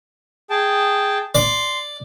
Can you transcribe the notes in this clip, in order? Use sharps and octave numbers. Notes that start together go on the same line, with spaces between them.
G#4 G5 A5
D5 C6